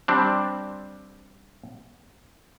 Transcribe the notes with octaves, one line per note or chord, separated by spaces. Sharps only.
G3 C4 D4